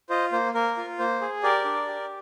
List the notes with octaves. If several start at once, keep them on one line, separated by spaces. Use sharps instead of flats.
F4 C5 D#5
A#3 C5
A#3 A#4
F4
A#3 C5
G#4
G4 A#4 D5
D4
G4